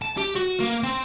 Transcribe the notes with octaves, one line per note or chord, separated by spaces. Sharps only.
A5
G4
F#4
A#3
C4